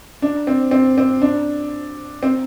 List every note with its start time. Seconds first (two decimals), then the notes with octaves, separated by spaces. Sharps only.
0.22 D4
0.47 C4
0.71 C4
0.98 C4
1.22 D4
2.23 C4